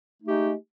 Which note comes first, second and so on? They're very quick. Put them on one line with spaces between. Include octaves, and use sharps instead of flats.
A3 D#4 G4 G#3